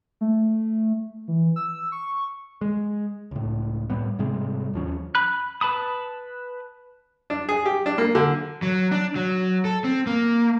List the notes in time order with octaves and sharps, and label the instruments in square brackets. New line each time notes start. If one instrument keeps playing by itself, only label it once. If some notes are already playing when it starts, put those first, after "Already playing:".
[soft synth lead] A3
E3
E6
C#6
[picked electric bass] G#3
C#2 A2
A2 G3 B3
G#2 C3 G3 G#3
D#2 F3 C#4
[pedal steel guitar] B5 F#6
B4 A5 B5 D#6
[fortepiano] D4
G#4
G4
D4
A#3
D3
[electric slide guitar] F#3
D4
F#3
A4
C4
A#3